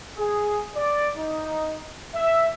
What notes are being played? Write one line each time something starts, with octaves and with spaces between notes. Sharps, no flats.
G#4
D5
D#4
E5